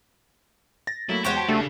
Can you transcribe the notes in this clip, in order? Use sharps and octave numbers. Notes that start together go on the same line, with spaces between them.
A6 A#6
F#3 A3 A#3 E4
E2 G#3 F#4 G4 C5 C#5
G5 A5 B6
C#3 A3 D4 G4 A4